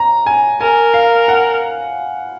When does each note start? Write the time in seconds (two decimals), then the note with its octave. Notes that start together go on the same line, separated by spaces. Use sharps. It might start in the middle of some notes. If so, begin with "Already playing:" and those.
Already playing: A#5
0.26 G#5
0.60 A#4 G#5
0.94 F5
1.28 F#5